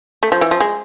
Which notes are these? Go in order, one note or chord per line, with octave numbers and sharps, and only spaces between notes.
A3
F3
E3
F3
G#3